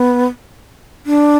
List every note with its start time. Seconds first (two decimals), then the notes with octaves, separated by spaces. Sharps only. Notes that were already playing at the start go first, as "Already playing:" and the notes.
Already playing: B3
1.06 D4